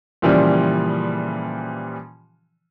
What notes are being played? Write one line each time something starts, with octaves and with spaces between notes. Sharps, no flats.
A#2 C#3 E3 F3 G3